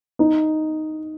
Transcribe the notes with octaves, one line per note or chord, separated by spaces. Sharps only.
D#4